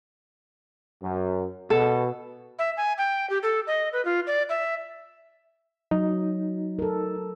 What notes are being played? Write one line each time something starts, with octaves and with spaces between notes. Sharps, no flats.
F#2
B2 A4
E5
G#5
G5
G4
A4
D#5
B4
F4
D5
E5
F#3 D#4
A4 A#4